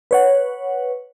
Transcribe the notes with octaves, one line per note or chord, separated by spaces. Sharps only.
B4 C#5 F#5